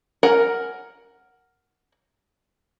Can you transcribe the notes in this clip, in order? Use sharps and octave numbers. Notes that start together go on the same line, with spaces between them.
A#4 F#5 G#5